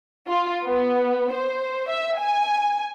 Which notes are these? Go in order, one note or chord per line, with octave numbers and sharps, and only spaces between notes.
F4
B3
C5
E5
G#5